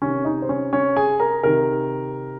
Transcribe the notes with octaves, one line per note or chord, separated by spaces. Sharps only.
C3 D#3 C#4 C#5
D#4 D#5
C5
C#4 C#5
C#4 C#5
G#4 G#5
A#4 A#5
C3 D#3 A#4 A#5